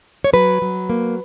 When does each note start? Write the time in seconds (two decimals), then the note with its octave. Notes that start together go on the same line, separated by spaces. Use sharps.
0.24 C#5
0.33 F#3 B4
0.62 F#3
0.90 A#3